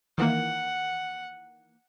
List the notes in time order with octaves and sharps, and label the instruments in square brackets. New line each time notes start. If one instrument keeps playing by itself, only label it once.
[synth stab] D#3 E3 A#3 [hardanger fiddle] F#5